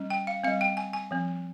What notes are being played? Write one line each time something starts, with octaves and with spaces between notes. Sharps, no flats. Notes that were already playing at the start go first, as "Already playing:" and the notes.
Already playing: G3 C#4
G5
F5
G3 C4 F5
G5
G#5
G#5
F3 C4